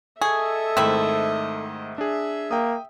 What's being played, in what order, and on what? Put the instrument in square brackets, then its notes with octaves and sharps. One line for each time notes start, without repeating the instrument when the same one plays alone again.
[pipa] G#4 [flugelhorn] A4 [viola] D#5 E5 [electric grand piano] C#6 G#6
[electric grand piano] G#2 D#3 A3 [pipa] C4 E4
[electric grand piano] D4 G#4 [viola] E5
[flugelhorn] A#3 [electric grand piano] G5 D#6